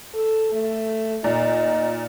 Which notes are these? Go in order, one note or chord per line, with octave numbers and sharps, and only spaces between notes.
A4
A3
A#2 D#4